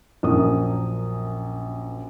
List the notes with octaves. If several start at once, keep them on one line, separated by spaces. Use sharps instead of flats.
A#1 F#2 A#4 D#6